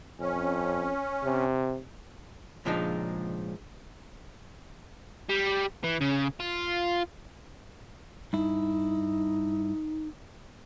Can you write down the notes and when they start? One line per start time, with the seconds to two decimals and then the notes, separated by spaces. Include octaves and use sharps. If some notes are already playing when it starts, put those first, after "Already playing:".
0.20 F2 C#4
1.23 C3
2.65 C#2 A#2 F3 G#3 D4 D#4
5.29 G3
5.84 E3
6.01 C#3
6.40 F4
8.33 G2 D#4 E4